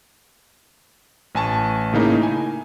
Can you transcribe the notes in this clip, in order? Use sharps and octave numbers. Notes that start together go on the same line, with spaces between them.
A1 G#5 A5 C#6
A2 C#3 A#3 D#4 E4
G#5